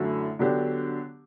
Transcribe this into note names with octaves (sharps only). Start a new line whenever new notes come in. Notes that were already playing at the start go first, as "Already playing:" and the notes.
Already playing: F#2 D3 F#3 A3 E4
D3 F#3 B3 D4 G4